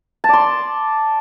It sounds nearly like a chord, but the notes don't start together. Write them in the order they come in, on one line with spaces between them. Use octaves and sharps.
A5 D5 C6